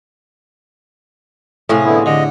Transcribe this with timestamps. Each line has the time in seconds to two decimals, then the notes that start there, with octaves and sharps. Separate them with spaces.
1.69 A2 C3 F3 G#4
1.85 D3 B3 E4
2.06 D3 D#5